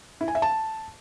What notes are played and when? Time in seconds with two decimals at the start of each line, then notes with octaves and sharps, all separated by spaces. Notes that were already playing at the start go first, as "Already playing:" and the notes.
0.21 E4
0.28 G#5
0.35 E5
0.42 A5